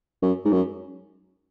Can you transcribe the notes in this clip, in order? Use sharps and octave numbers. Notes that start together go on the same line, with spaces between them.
F#2
G#2
F#2